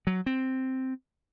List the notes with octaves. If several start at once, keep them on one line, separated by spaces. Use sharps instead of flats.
F#3
C4